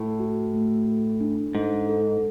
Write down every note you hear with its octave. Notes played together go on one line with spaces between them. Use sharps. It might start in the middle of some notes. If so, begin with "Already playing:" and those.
Already playing: A2 A4
F#4
A3
A4
D4
G#2 A4
A4